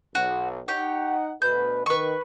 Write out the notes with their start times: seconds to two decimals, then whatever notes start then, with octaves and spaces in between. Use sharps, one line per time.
0.15 B1 F#4
0.68 D#4 G4 C#5 F#5
1.42 D2 B2 B4 G6
1.86 D#3 B4 C#6